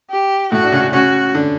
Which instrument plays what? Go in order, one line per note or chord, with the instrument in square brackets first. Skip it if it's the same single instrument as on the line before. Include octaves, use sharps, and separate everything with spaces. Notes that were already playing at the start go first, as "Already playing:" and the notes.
[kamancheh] G4
[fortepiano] A2 A3 [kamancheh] F#4
[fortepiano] D4
C#3 C#4
[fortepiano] C#3 C#4 [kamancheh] F#4
[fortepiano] D3 D4